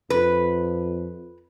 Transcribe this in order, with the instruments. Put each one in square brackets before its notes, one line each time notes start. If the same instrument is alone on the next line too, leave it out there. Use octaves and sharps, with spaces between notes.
[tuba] F2 [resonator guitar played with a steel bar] B4